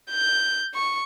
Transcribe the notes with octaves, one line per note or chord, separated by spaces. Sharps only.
G6
C#6